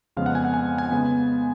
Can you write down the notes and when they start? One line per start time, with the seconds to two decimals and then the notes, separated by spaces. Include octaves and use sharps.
0.16 F2 C#3 F3 G#3 B3 F5
0.26 F#5
0.35 G#5
0.45 F#5
0.54 G#5
0.78 G#5
0.91 C#3 G#3 B3